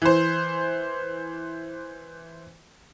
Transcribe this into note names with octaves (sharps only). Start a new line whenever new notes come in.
E3 C5